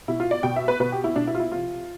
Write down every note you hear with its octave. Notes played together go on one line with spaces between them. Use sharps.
B2 E4
F4
D5
B2 G5
E5
B4
B2 B4
G4
E4
B2 D4
E4
F4
E4
C3 F3 F4